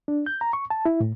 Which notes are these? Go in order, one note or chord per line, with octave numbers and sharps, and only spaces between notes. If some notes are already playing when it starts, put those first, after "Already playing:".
D4
G6
A#5
C#6
A5
E4
A2